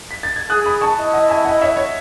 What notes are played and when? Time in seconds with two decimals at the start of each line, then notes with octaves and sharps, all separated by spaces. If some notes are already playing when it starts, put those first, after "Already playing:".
0.11 B6
0.23 A6
0.36 G#6
0.49 G#4 D#6 F#6
0.66 B5 D#6
0.81 A5 C#6
0.98 E4 D#5
1.13 D#5 F#5
1.29 E5 G#5
1.45 D#5 F#5
1.62 C#5 E5
1.77 C#5